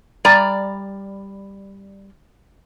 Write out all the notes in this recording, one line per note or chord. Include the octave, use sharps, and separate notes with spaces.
G3 D5 A#5